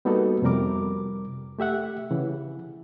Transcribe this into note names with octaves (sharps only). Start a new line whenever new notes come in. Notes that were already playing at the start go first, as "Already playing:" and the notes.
G3 A#3 B3 D#4 F#4 A4
F2 C3 G3 A#4 D6
A3 G4 E5 F#5
C#3 E3